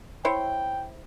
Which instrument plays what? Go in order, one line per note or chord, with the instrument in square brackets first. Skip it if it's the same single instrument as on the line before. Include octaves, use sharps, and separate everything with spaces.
[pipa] E4 C5 C#5 [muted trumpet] G5